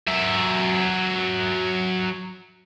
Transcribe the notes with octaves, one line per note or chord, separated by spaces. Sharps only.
F#3 E5